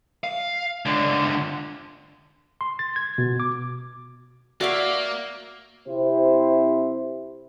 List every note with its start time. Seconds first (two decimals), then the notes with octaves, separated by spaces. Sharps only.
0.24 F5
0.86 C#2 D3
2.61 C6
2.79 A6
2.96 G#6
3.18 B2
3.40 D6
4.61 A#3 F#4 D5 E5 F5
5.88 C3 C4 E4 G4 C5